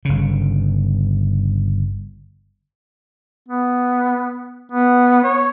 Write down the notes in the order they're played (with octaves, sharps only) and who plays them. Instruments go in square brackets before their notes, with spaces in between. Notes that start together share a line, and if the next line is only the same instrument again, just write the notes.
[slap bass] G1 C#3
[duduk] B3
B3
C#5